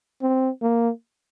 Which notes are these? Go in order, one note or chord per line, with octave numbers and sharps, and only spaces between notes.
C4
A#3